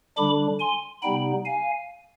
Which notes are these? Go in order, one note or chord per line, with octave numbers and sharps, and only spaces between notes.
D3 G3 D4 B5 D6
G#5 C6
C3 G3 B3 D#4 G5 B5
F5 G#5